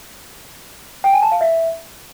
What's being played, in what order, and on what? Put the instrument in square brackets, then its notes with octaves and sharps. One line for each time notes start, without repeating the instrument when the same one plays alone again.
[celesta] G5
G#5
A5
F5
E5